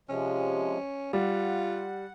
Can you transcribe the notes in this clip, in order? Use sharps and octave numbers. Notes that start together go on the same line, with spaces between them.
C3 F3 G#3 C#4
G3 F4 F#5